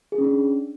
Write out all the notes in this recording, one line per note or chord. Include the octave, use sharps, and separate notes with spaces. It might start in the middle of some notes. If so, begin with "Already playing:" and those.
G#4
C#4
D4